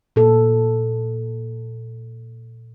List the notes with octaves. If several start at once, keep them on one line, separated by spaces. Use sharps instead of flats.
A#2 A4